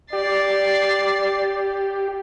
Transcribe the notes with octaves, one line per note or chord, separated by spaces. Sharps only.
G4 D5 A6 C7